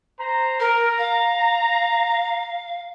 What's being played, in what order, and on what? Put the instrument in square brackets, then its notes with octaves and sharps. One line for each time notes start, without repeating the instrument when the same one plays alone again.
[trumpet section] C5 A#5
[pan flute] A#4 [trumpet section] A#5
[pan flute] F5